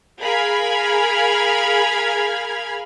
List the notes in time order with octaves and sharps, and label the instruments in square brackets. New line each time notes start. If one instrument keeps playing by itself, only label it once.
[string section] G#4 A#4 F5 B5 F6 G#6